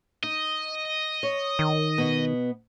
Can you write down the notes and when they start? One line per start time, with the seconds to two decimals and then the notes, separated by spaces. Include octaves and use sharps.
0.23 D#4 D#5
1.23 C#5
1.59 D#3
1.98 B2 B3